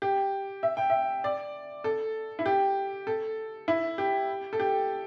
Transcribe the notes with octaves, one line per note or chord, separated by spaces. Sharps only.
G4
E5
G5
E5
D5
A4
E4
G4
A4
E4
G4
A4
G4